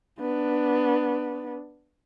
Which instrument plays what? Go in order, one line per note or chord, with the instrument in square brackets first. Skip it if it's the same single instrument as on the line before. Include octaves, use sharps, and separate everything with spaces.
[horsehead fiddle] B3 D4